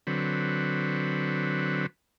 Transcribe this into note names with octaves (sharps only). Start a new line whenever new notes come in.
D3 F#3 C4 B4